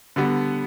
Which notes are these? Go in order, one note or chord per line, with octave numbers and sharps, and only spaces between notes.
D3 G3 B3